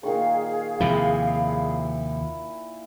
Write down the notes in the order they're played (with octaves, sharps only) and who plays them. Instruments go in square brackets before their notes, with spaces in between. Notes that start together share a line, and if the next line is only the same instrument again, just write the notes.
[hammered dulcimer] A#2 D#3 C#6 [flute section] G#4 F5
[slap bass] D#2 C3 F3 [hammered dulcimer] E4